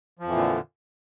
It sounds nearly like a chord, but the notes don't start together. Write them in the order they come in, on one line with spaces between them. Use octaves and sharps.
F3 F2 E3 A#2 D3